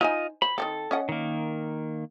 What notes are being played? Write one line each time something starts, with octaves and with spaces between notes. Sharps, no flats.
D#4 F4 C5 D#5 G#5
C5 B5
D#3 E3 C4 A4
C#4 D#5 F#5
D#3 A#3